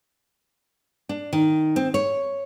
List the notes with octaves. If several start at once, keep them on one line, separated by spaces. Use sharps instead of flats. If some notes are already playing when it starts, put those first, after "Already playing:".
D4
D#3
C4
C#5